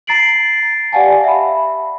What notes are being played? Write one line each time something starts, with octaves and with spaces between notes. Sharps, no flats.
A#5 A6 C7 D7 F#7
G4 D5 F5 F#5 G#5 A5
E5 B5